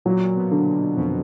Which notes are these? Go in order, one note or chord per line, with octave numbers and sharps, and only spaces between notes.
A#2 F#3
B2
D3
A#2
F2 B2